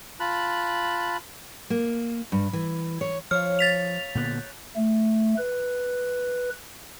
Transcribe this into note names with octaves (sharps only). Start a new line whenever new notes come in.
F4 A5 B5 F#6
A#3
G2
E3
C#5
F3 C#5 F5 F6
A6 B6 F7
A#2 D3 B3 F#6 G6
A3
B4